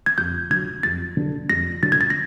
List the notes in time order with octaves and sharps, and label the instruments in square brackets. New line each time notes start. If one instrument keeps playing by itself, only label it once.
[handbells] G#6
[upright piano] F2 [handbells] G6
[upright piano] D3 F#3 [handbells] G#6
[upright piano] F2 [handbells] A6
[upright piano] D3 F#3
[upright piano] F2 [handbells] A#6
[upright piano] D3 F#3 [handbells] A6
[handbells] G#6
A6
A#6